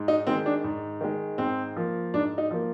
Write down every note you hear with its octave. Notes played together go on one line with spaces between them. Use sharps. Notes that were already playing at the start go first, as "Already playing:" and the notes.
Already playing: G#2
D#4
D#3 G#3 C4
D4
G#2
D#3 G#3
G#2 C4
F3 A#3
G#2 D4
D#4
F3 A#3